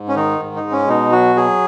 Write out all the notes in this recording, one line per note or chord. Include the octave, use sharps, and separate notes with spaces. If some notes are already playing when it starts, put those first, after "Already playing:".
Already playing: G#2
C#4
D#3 D#4
G#2
D#4
G#3
C#4
B2 D#4
F#3 F#4
F#3 G#4